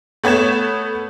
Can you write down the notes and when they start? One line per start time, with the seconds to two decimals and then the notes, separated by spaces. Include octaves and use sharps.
0.24 A3 B3 C#5 G#6 E7